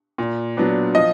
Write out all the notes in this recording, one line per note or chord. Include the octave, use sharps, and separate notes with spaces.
A#2
F#3 B3 D4
F3 D#5